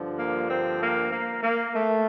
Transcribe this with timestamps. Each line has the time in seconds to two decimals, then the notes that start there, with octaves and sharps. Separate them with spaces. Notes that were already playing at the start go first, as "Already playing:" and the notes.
Already playing: G2 D3 F3
0.18 A#3
0.49 C4
0.80 A#3
1.11 A#3
1.43 A#3
1.74 A3